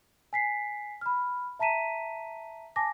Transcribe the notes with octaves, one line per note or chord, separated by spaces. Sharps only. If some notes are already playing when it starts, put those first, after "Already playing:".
G#5 B6 C7
B5 F6
E5 A5 A#5 B6 D#7 E7
G#5 A5 D6 A#6